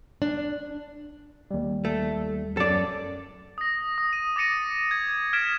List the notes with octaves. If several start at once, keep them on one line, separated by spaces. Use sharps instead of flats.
D4
D#2 G3
A3
F#2 F#3 A4 D5
D#6 A#6
D#6
D#7
D6 A6 A#6 C#7 D#7
G#6
F6 G#6 B6 D7 E7